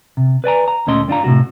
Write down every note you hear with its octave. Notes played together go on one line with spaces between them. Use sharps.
C3
B4 D5 G#5 A#5
A#5
D2 A#2 A3 C#4 D#5 C6
G2 D4 F4 A#5
A2 C3 F#4